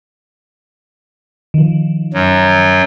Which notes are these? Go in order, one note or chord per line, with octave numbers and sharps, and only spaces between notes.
D#3 F3
F#2 F#3